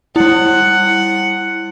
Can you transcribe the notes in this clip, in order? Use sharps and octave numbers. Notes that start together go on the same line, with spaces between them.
G3 E4 F#5